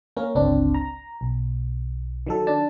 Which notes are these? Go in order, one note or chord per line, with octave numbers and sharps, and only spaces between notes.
A#3 C#4 A#4
G1 C#2 C4 D4
A#5
B1
D#3 F#3 A4
D4 A5